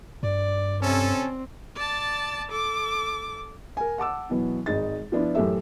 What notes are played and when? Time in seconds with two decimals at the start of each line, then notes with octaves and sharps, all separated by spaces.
0.23 G2 D5
0.83 C3 C4 C#4 A4
1.76 D5 A5
2.52 A4 D6
3.77 A#4 G#5
3.98 F#5 A5 D6 E6
4.30 B2 E3 F#3 B3
4.66 G#1 G#3 D#4 A6
5.12 F3 B3 D4 E4 F4
5.35 F#2 A2 E3 G4 A4 E5